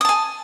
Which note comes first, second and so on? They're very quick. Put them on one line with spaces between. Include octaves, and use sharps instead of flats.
D#6 A5 G#5